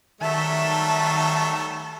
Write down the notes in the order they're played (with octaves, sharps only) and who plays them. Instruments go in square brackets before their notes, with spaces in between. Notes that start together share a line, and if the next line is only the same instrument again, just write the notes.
[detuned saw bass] D#3 [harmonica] F#3 G3 A3 [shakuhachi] E5 [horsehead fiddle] A5